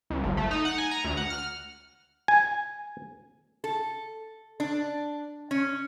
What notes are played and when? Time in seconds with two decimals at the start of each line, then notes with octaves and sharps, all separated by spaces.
0.10 C#2
0.24 G1
0.37 A3
0.51 D#4
0.65 F#5
0.78 G#5
0.91 A#5
1.04 D2
1.17 F#5
1.30 F6
2.28 G#5
3.64 A4
4.60 D4
5.51 C#4